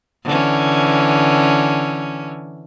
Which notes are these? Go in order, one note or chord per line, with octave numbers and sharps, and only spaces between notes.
D3 E3 C#4